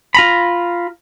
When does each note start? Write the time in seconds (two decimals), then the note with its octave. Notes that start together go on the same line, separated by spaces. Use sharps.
0.15 F4 A#5 B5